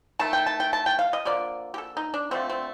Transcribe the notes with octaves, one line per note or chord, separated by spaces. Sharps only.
D#3 A3 A5
G5
A5
G5
A5
G5
F5
D#5
D3 F3 A#3 D5
G4
A4
D#4
D4
D3 F3 A3 C4
C4